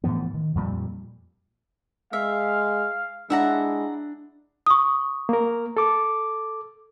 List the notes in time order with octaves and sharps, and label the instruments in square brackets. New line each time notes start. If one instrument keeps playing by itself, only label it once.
[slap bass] A2 E3 F3 B3
D#3
F2 A#2 G3
[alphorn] G#3 [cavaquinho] E5 [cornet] F5
[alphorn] G#3 [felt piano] D4 [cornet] E4 [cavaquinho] E5 F#5 A#5
[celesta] C#6 D#6
[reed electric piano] A#3 A#4
A4 D6